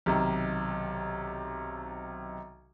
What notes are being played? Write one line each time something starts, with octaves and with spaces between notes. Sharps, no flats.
B1 C3 D#3